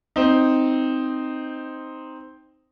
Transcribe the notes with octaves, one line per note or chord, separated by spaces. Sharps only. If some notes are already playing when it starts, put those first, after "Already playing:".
C4 D#4